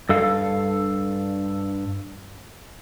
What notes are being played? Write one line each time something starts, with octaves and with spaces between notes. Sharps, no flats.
G2 A4 F5